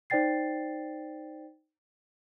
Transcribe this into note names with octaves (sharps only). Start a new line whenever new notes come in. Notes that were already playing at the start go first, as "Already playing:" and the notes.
D#4 C5 D5 G5 A6 C7